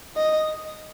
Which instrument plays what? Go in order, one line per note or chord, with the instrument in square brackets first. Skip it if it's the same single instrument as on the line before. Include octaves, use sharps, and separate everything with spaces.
[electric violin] D#5